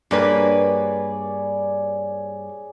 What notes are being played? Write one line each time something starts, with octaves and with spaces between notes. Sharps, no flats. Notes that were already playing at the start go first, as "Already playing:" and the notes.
G2 A#3 G#4 B4 C#5 D5